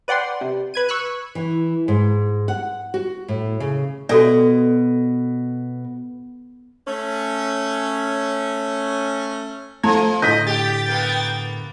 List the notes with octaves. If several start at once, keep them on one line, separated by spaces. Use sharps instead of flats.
B4 D5 F#5 G5 C6
C3
B4 G#6 D#7
C#6 E6 F#6
E3
G#2
F#5
F#4
A2
C#3
B2 F#4 A4 D5
A3 C#4
F3 A3 A5 A#5 G#6
A2 D3 D#5 G6 B6
G4 G5 A6
A#3 B3